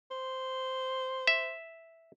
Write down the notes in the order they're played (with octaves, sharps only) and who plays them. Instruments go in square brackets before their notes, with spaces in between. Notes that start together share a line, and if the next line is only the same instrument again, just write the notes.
[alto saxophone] C5
[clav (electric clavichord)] E5